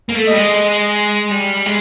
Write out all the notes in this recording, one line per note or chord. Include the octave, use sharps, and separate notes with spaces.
A#3
A3
G3 D#5
G#3
G3
G#3